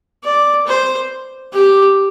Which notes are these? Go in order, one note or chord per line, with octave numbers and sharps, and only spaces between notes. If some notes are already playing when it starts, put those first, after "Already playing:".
D5
C5
G4